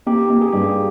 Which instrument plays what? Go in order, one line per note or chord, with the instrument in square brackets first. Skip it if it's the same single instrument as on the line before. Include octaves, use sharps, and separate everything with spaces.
[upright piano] A#3 [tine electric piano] G4
[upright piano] A#3
[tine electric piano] G#4
[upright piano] G2 [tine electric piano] G4
[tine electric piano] G#4